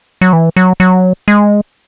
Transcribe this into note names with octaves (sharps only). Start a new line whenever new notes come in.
F#3
E3
F#3
F#3
G#3